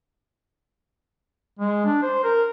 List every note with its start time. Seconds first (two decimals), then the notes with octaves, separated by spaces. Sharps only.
1.59 G#3
1.85 D4
2.02 C5
2.24 A#4